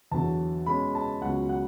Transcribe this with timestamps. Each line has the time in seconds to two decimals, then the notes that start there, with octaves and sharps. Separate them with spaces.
0.11 E2 D3 F#3 A5
0.66 B2 G#3 C#4 B5
0.95 A5
1.22 C#2 B2 F#3 C#4 F#5
1.49 F#5